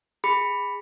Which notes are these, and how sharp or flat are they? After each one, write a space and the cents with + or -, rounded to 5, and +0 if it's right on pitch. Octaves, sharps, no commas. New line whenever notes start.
G#4 -20 B5 +0